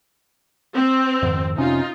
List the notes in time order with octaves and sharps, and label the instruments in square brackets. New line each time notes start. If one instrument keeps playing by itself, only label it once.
[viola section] C4
[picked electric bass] F2 G#2 D#3
[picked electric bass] F1 C3 C#4 [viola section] D#4 F4